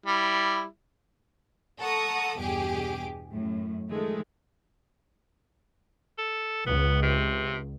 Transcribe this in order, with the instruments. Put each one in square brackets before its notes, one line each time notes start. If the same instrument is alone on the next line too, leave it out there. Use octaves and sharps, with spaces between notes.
[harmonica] G3 E4
[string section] A4 F#5 A#5 C#6 D#6
E2 G2 B2 G4 G#4 D6
F#2 A2
D#3 F3 G#3 A3
[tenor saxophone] A4
[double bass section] C#2 [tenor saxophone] B3
[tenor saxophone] C3